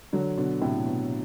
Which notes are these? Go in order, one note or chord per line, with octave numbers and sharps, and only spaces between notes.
D3 F#3
B2 D3
A2 C3
B2